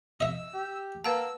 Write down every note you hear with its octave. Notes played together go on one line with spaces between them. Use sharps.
D#5 E5 E6
G4
A#3 B4 F#5 A5 E6